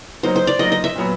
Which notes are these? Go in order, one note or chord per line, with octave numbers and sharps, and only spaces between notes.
F#3 A#3 D#4 C5
C5
D5
F#3 A#3 D#4 D#5
D#5
E5
A#2 F#3 B3